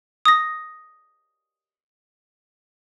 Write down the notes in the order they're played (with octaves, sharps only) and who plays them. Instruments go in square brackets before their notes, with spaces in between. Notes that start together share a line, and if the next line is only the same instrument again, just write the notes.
[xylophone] D#6 A#6